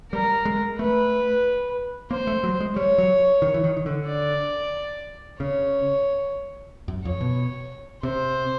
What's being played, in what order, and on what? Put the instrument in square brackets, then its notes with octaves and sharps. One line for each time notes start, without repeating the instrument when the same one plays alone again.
[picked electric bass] G3 [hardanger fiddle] A#4
[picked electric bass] G#3
[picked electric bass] A3 [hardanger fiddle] B4
[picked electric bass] A#3 [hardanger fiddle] C5
[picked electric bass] A3
F#3
G#3
[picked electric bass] G3 [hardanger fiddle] C#5
[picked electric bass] F#3
D#3
E3
D#3
D#3
D3
[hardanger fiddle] D5
[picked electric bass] C#3 [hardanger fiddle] C#5
[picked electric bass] F#2
[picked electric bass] F2 [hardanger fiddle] C#5
[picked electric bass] B2
[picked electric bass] C3 [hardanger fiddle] C5